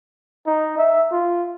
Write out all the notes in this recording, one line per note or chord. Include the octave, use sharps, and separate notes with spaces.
D#4
E5
F4